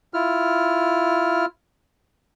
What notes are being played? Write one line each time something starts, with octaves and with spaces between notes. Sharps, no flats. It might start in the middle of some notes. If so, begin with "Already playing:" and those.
E4 F4 F6